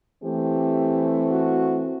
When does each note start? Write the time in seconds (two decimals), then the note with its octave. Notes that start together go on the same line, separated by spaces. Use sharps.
0.22 E3 A3 C4 G4
1.31 F#4